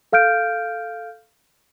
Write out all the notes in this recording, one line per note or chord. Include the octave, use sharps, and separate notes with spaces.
A4 F5 F6 G6 D7